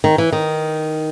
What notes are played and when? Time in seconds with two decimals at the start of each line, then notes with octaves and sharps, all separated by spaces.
0.04 D#3
0.18 E3
0.32 D#3